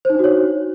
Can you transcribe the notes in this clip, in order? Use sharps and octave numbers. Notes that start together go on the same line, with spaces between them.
D4 D#4 F#4 C5 C#5